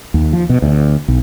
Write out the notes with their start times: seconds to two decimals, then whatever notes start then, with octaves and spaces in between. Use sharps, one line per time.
0.14 D#2
0.33 F3
0.49 B2
0.62 D2
1.08 B1